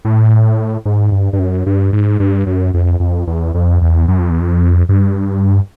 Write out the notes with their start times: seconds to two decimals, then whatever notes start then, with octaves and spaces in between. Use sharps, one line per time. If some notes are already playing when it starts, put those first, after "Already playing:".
0.05 A2
0.85 G#2
1.12 G2
1.33 G2
1.39 F#2
1.66 G2
1.93 G#2
2.20 G2
2.47 F#2
2.74 F2
3.00 F2
3.27 E2
3.54 F2
3.82 E2
4.08 F#2
4.19 F2
4.30 E2
4.40 F2
4.89 G2